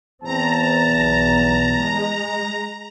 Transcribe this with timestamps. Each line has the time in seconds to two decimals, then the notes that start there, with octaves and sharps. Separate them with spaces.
0.24 E2 C4 A5 A#5
0.86 B1
1.80 G#3